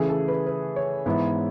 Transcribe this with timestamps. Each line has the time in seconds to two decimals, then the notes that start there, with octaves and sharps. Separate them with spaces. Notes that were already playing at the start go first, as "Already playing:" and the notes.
Already playing: C#3 E3 A3 G#4
0.09 A4
0.28 B4
0.47 B4
0.76 C#5
1.06 G#2 E3 B3 E4